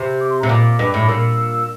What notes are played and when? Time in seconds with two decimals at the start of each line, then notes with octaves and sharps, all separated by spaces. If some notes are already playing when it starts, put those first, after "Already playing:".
Already playing: C3
0.20 D6
0.30 C6
0.40 A#5
0.43 C3
0.49 A#2 D6
0.79 G2
0.94 A2
1.00 D6
1.08 A#2 E6